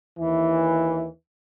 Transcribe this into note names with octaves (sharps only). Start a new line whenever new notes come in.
D#2 E3